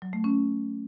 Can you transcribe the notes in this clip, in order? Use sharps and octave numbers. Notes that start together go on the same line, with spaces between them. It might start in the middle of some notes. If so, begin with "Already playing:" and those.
F#3
A3
C#4